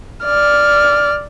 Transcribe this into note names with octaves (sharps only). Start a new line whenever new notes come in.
D5 F6